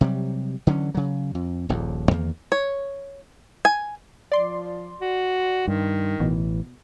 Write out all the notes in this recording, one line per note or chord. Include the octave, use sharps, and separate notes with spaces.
C3 F#3 G3
D3 E3 F#3 C#4
C#3 F#3
F2
D#1 A#1 D#2
E2 D#3 A#3
C#5
G#5
F3 D5 C6
F#4
G2 D#3
A1 B2 E3